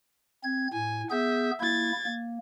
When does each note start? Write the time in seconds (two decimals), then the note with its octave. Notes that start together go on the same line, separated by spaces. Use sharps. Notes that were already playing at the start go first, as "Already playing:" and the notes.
0.44 C4 G#6
0.73 A2 G#5
1.11 B3 G#4 E5 G6
1.61 A#3 E4 G#6 A6
2.06 A#3